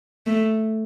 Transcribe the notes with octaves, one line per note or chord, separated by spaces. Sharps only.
A3